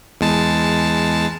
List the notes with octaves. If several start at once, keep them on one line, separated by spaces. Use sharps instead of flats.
E2 G#3 A5